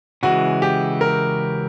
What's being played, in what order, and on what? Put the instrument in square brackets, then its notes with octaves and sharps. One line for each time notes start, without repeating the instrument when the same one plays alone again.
[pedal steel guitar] C#3 E3 G#3 [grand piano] F#4
[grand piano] G4
A#4